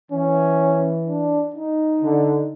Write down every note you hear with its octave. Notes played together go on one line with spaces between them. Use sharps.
E3 C#4
D4
D#4
D3